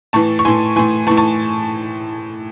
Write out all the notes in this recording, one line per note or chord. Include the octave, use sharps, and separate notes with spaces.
A2 E3 A5 C#6
C#6
A2 E3 G#5 C6
A2 E3 G#5 C6
A2 E3 A5 C#6
A5 C#6